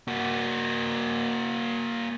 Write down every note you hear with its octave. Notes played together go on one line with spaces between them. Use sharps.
A#3 F#4